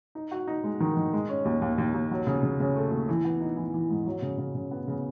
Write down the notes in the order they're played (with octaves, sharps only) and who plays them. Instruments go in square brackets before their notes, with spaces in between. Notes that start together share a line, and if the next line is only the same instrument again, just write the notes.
[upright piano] D#4
F#4
D#4
G#3
D#3
D#3
G#3
C#4
D#2
D#2
D#2
D#2
F#3
C#3
C#3
C#3
A3
D#2
E3
B3
D#4
E3
E3
G#2
F#3
C#3
C#3
C#3
B3
C#3